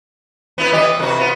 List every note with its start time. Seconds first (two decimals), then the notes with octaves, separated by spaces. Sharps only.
0.58 B3 E4 B4
0.72 E3 G4 D#5
0.99 C3 F#4 B4
1.19 B3 F4